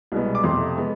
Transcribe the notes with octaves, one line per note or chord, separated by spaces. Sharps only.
C2 B2 G#3 B3
D6
F2 C3 F3 A3 C6
G#3 B3